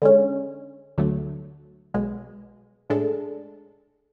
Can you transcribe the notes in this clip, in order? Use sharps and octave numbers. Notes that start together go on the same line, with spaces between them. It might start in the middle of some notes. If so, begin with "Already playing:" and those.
D3 G#3 C#4
D2 D3 F#3 A3
B1 B2 G#3
A2 G#3 D4 A4